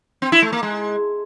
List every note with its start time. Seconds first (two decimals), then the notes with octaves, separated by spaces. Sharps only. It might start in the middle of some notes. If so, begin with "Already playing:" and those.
0.22 C4
0.32 E4
0.42 A3
0.53 A#3
0.63 G#3